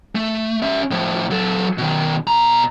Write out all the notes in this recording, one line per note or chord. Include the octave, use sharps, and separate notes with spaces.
A3
C#4 E5
A2 F3
F#3 A4
B2 D#3
B2 A#5